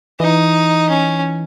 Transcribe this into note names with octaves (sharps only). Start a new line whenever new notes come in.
E3 D#4
C#4